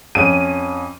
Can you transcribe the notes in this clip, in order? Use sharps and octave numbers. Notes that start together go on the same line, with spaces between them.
F2 C#4 D#7